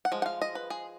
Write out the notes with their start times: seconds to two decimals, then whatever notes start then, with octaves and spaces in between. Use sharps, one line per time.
0.05 F#5
0.12 F3 G#3
0.22 F#5
0.26 F5
0.42 D#5
0.55 B4
0.70 G#4